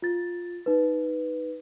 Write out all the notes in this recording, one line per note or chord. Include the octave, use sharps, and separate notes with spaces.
F4 A6
D#4 B4